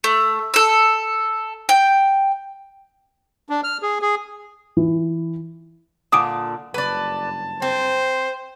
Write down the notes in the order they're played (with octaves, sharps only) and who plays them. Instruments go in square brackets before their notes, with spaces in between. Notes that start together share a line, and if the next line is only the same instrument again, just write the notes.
[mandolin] A3
A4 E6
G5
[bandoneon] D4
F6
G#4
G#4
[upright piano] E3
[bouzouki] A#2 D3 [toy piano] G#5 D6 D#6
[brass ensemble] F#1 G2 A5 [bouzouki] B4 D5
[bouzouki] C4 [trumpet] C5